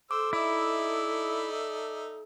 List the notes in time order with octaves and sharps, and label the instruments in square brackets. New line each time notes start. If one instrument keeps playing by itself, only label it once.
[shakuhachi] A4 [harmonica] C5 E6 [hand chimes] D6
[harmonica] D#4 D5 E5 [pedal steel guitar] E4